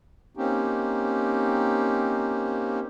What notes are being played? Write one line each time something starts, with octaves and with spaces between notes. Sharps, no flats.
A#3 C4 C#4 D#4 G4